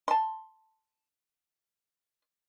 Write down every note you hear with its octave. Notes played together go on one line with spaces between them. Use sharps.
A5 C6